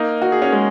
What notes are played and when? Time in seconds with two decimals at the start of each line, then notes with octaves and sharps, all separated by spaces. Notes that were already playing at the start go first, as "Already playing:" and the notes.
Already playing: A#3 D#4
0.22 F#4
0.32 G#4
0.42 C#4 F#4
0.52 G#3